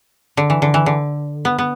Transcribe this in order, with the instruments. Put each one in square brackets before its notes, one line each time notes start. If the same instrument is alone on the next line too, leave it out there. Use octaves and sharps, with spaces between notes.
[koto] D3
E3
D3
E3
D3
B3
B3